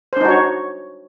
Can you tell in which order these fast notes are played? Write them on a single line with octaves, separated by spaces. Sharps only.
C5 D4 D#4 F#4 C#5